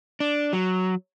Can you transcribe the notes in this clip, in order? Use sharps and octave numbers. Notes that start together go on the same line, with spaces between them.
D4
F#3